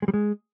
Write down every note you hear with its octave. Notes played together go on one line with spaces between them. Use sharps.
G#3
G3
G#3